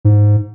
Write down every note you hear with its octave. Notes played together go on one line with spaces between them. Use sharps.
G#2